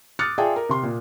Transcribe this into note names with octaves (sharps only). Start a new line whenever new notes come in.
D6 D#6 F6 F#6 A6 C#7
F4 G#4 D5 E5 G5 A5
A#4
C3 C6
A#2